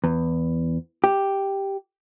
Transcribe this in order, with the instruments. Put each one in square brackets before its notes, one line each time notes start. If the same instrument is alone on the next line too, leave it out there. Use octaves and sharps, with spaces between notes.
[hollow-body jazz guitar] E2
G4